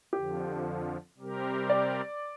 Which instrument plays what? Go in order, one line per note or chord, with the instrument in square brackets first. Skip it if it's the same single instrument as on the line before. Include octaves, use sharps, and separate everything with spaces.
[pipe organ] F2 D3 F3 [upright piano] G4
[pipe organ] C3 G3 C4 G4 A#4
[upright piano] D5